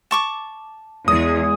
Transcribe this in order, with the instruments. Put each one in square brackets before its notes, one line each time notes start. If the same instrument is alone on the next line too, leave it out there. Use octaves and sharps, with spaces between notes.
[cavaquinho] A5 C#6 D6
[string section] E2 [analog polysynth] G#3 G#4 [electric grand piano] D#6